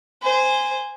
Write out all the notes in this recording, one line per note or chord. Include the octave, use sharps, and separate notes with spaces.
C5 G#5